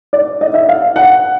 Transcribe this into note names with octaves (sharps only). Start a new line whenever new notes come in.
D5
D#5
E5
F5
F#5